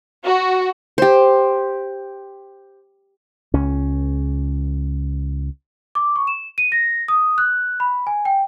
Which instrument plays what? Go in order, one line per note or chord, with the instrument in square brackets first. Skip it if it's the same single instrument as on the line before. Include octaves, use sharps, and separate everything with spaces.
[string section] F#4
[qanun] G4 C5
[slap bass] C#2 C#4
[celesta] D6
C#6
E7
D#7
A#6
D#6
F#6
B5
G#5
G5